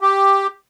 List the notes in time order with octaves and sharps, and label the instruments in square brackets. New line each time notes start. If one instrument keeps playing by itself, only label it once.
[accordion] G4